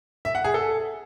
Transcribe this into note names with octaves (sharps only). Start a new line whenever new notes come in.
E5
F#5
G#4
A4